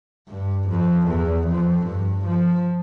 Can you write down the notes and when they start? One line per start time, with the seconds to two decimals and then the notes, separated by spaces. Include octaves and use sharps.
0.29 G2
0.69 F2
1.08 E2
1.48 F2
1.87 G2
2.26 F3